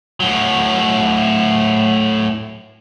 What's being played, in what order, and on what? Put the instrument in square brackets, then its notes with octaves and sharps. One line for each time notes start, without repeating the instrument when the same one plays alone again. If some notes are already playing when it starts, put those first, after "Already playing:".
[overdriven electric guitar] A2 F#3